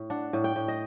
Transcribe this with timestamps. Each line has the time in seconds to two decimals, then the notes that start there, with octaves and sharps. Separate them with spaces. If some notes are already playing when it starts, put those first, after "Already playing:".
Already playing: A2
0.10 D4 F#5
0.33 A2
0.44 G5
0.56 A2
0.68 D#5